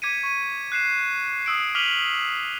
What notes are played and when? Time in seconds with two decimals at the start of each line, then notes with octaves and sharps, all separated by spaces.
0.02 D6 G#6 B6 C#7 D#7
0.23 C#6 D#7
0.72 F#6 C7 E7
1.46 D#6 E6 D7
1.75 D6 F6 B6 D#7 F7 F#7